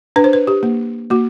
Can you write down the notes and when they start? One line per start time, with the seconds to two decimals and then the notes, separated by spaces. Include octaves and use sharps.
0.16 D4 B4
0.24 C5
0.33 B4
0.47 G4
0.63 A#3
1.10 A#3 F#4